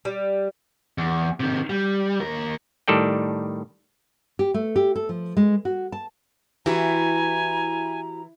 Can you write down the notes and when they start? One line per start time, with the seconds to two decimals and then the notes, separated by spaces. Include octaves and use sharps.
0.05 G3
0.98 E2
1.40 C3 D#3
1.70 G3
2.20 D#2 A#4
2.88 A2 D#3 G3 A4 D5 G5
4.39 G4
4.54 A3
4.76 G4
4.96 A4
5.09 F3
5.37 G#3
5.65 F#4
5.92 A5
6.66 E3 E4 F#4 G4 G#5 A#5